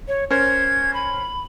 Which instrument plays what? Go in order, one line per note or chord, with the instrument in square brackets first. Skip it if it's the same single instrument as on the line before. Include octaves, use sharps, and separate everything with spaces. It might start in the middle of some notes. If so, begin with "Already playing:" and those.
[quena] C#5
[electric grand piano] C#4 A#4 C5 [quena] G#6
[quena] B5